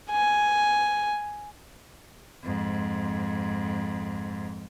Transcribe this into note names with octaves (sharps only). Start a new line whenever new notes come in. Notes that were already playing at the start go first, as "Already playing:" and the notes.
G#5
F2 G#2